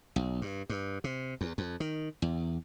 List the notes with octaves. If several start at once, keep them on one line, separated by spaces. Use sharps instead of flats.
B1
G2
G2
C3
E2
F2
D#3
E2